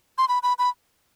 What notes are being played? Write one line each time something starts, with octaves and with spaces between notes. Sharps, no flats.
C6
B5
B5
B5